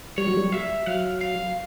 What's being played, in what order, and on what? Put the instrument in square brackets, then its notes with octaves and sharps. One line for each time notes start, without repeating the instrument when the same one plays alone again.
[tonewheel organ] G3 [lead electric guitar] C#5
[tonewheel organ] F#3
G3
[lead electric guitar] E5
[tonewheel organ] F#3 [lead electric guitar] F5
[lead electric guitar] F5